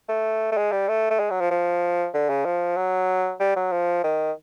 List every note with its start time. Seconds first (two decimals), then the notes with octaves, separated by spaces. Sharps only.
0.09 A3
0.52 A3
0.57 G#3
0.72 G3
0.89 A3
1.10 A3
1.20 G#3
1.30 F#3
1.40 F3
1.51 F3
2.14 D3
2.30 C#3
2.45 F3
2.77 F#3
3.40 G3
3.56 F#3
3.72 F3
4.04 D#3